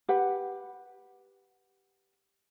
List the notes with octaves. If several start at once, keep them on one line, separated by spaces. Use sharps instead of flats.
G4 B4 F#5